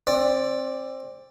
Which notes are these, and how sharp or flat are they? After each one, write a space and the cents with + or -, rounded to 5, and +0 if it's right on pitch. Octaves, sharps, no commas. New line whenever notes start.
C4 +25 D5 +0